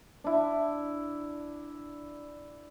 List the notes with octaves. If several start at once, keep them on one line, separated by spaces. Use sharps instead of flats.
D4 E4